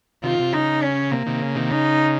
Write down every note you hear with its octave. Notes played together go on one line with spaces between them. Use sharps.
C3 D#3 F4
C3
C#3 D#4
C#4
C3 A#3
C3 D#3
C#3
C3 D#3
C#3 D#4